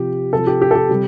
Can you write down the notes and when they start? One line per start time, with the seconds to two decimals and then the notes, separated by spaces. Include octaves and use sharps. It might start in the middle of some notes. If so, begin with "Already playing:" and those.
Already playing: C3 F3 G4
0.32 C3 F3 A4
0.47 G4
0.62 G4
0.71 A4
0.76 G4
0.89 C3 G3